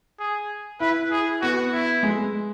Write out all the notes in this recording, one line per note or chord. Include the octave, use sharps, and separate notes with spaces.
G#4
E4 B4
G#4
B3 F#4
E4
G#3